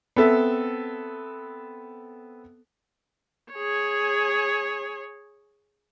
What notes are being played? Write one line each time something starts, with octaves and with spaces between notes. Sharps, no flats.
B3 C4 A4 E5
G#4 C#5